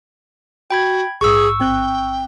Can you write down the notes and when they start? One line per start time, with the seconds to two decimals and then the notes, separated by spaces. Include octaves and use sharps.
0.71 F#4 G5 B5 G#6
1.21 A#1 G#2 G#4 C#6 E6
1.60 A1 C4 G5 F#6